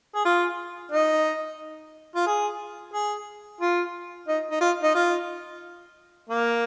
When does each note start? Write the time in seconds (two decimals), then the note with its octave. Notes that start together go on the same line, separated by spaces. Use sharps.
0.15 G#4
0.25 F4
0.92 D#4
2.15 F4
2.27 G#4
2.94 G#4
3.61 F4
4.28 D#4
4.51 D#4
4.61 F4
4.83 D#4
4.95 F4
6.30 A#3